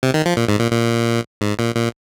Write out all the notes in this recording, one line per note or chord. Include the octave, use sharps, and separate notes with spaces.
C3
D#3
F3
A#2
G#2
A#2
A#2
G#2
A#2
A#2